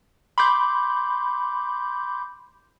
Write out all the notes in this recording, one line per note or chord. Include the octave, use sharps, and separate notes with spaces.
B5 C6 D6 G6